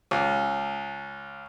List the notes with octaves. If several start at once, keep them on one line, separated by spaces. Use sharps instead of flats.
C#2